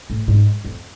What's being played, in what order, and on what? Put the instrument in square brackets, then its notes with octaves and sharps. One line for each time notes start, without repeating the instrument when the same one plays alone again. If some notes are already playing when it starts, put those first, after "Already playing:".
[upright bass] A2
G#2
F2